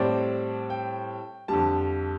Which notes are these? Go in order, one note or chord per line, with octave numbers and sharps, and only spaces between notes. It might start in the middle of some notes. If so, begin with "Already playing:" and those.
Already playing: A2 G3 C4 D5
G5
F2 D3 G3 A5